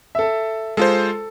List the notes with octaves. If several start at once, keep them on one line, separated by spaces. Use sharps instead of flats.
A4 E5
G#3 F4 A4 C5